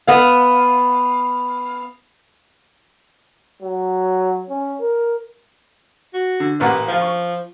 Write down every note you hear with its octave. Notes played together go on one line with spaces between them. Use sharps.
B3 F5
F#3
C#4
A#4
F#4
D3
A1 A#2 B4 F#5
F3 F4 F5
C#6